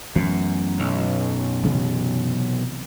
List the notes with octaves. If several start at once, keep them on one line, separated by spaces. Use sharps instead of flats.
F#2 E3 A3 B3
B1
C3 E3 F#3